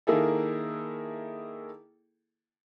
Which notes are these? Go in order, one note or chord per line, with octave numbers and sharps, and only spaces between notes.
D#3 A#3 E4 G#4 A4